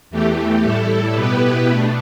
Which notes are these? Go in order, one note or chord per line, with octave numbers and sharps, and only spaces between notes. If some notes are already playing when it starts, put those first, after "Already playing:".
E2 E3 A3 G4
A2 G3 E4 A4
B2 B3 E4 G4 B4
B2 A3 D4